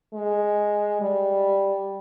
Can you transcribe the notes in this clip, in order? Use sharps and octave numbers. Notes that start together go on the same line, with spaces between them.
G#3
G3